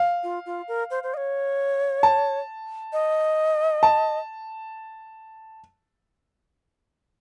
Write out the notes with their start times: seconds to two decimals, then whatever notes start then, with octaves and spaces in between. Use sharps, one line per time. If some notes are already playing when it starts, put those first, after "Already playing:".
Already playing: F5
0.23 F4
0.46 F4
0.68 A#4
0.90 C5
1.03 C5
1.14 D#5
1.17 C#5
2.03 A5
2.93 D#5
3.83 A5